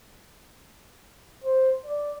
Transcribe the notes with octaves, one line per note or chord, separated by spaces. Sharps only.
C5
D5